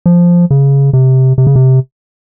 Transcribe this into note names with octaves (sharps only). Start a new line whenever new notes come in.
F3
C#3
C3
C3
C#3
C3